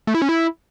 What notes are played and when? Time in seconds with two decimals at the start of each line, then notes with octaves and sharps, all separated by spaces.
0.07 A3
0.15 E4
0.22 C#4
0.29 E4